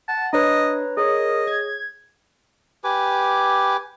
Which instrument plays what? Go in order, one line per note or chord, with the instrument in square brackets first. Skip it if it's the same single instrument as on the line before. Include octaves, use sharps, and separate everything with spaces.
[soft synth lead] F#5 [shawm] A5
[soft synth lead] D4 [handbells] B4 C#5 A#5 [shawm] D#5
[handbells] G#4 C#5 [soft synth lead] A#4 [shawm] D#5
[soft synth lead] G#6
[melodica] G4 B4 G#5 D6